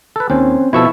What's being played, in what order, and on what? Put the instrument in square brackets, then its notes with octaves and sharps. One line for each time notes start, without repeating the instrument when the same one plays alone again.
[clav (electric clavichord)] A4 B4
[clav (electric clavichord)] D#2 [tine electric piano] C4 C#4 C5
[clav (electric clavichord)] B2 F3 A4 [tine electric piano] E4 C#6 E6